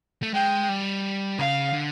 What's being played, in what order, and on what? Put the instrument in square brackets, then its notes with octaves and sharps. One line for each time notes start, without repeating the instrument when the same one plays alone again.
[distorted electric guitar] A3
[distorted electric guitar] G#3 [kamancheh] G5
[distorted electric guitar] G3
[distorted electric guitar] C#3 [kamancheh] F5
[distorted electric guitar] D3